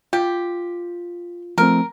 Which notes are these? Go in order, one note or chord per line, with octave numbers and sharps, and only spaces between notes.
F4 G4
F3 A3 C4 A#4